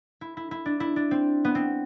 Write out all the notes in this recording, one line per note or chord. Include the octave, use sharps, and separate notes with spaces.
E4
E4
E4
D4
E4
D4
C4
B3
C4